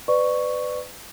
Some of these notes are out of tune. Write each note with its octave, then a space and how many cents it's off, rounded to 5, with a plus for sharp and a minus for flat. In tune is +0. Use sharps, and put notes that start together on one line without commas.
B4 +30 D5 +25 C#6 +5